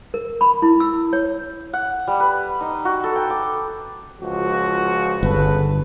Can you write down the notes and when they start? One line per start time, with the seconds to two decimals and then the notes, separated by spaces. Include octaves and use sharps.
0.14 A#4
0.41 B5
0.62 E4
0.80 E6
1.13 C#5
1.73 F#5
2.08 G3
2.20 B4
2.61 D#4
2.85 F#4
3.04 A4
3.15 G5
3.30 D6
4.20 C#2 F3 F#4
5.23 G1 C#3 A4 B4